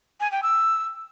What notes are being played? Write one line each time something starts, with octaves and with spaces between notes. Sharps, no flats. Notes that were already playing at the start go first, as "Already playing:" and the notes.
G#5
G5
E6